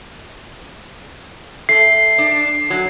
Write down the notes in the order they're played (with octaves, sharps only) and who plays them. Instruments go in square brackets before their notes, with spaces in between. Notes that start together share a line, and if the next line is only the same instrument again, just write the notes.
[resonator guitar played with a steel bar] A3 [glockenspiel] C7
[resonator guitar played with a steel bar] D4
F#3